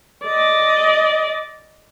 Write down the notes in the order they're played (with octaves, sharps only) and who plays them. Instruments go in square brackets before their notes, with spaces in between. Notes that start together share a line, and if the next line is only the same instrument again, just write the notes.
[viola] D5 D#5